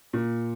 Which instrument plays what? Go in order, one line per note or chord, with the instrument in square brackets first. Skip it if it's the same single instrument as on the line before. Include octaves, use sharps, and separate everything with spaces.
[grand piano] A#2